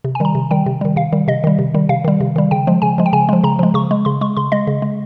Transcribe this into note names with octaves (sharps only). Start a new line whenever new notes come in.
C3
G#5
D#3 G3 A#5
C3
D#3 G3 G5
C3
D#3 G3
C3 F5
D#3 G3
C3 D#5
D#3 G3
C3
D#3 G3
C3 F5
D#3 G3
C3
D#3 G3
C#3 G5
F3 G#3
C#3 G#5
F3 G#3
G5
C#3 G#5
F3 G#3
C#3 A#5
F3 G#3
C#3 C#6
G#3
C#3 C6
G#3 C#6
C#3 C6
G#3 D#5
C#3
G#3